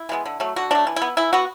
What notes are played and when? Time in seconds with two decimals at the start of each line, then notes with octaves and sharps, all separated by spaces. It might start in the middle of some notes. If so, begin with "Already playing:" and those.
Already playing: E4
0.09 E3 G#3 B3
0.26 D3
0.40 F#3 A3
0.56 D3 F#4
0.71 F#3 A3 D4
0.87 E3
0.96 E4
1.02 B3
1.17 E3 E4
1.33 B3 F#4